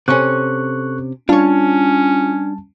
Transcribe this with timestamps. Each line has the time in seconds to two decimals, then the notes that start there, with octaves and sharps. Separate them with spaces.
0.08 C3 C#4 A4 C#6 F#6
1.29 G3 C#4 D4 F4 C#5 A5